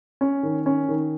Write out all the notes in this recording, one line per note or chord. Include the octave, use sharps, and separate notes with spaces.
C#4
D#3
C#4
D#3